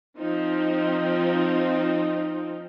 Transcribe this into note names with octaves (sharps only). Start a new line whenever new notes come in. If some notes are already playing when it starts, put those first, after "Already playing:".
F3 C4 D#4